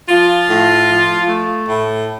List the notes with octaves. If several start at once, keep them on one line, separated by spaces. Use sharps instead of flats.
F3 F4
A2
F3
A3
A2